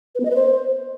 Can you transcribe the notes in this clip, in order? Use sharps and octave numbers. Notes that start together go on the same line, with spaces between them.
B4
B3
D#5
B4
C5